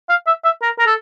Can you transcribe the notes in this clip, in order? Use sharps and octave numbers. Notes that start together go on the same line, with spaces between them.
F5
E5
E5
A#4
A#4
A4